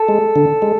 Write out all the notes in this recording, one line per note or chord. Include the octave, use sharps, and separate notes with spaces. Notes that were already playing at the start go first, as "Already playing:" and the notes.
Already playing: A4
G#3
D3
G#3